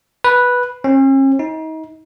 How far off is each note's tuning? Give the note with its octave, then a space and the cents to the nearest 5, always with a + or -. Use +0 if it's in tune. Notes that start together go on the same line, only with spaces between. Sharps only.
B4 -5
C#4 -45
D#4 +35